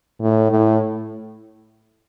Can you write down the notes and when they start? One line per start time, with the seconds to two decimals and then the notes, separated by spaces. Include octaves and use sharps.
0.21 A2
0.51 A2